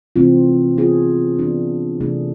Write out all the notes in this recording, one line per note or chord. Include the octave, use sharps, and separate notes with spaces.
C3 E3 A3 C4 F4
E3 B3 F4 G#4
E3 B3 D4
C3 E3 A3 D4 G#4